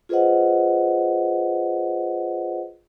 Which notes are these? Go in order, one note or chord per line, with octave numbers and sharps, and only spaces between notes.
F4 G#4 B4 C5 D#5 F#5